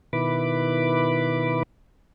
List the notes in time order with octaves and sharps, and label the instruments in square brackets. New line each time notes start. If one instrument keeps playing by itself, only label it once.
[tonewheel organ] B2 D#3 E4 B4 B5 D6